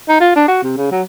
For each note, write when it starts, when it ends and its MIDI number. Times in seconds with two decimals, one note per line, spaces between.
0.09 0.17 63
0.20 0.31 65
0.36 0.46 62
0.48 0.58 66
0.63 0.76 48
0.77 0.90 49
0.91 1.02 54